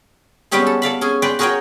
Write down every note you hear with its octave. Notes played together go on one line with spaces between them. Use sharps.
G3 G#3 B3 C#4 G4 G#4
A4
A4 D5 F5 B5
C#4 G#4 G#5
B4 D5 G5 C6
F#4 G#4 A#4 C#5 F#5 G5